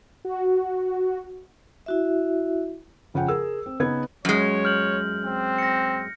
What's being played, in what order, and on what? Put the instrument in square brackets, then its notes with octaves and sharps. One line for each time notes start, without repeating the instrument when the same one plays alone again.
[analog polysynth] F#4
[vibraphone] E4 F#4 E5
[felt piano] F2 C#3 F4 F#5 G5
G#4 A#4 E6
C4
C#3 B3 D#4 G#6
[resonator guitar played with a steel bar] F#2 G#3 [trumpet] C#5
[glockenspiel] F6 G6 F#7
[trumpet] C4
[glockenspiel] A#6 C#7